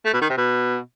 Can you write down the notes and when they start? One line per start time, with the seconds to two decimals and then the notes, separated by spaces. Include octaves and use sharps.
0.05 A3
0.13 B2
0.21 D#3
0.30 C3
0.38 B2